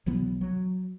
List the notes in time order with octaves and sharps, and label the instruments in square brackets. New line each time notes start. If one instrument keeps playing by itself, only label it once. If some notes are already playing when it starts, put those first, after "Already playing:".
[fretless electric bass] B1 E3 F#3 B3
F#3